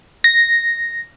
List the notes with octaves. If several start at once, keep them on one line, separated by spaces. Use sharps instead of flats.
A#6